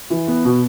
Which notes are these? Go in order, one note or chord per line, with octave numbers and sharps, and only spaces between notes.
E3
B3
B2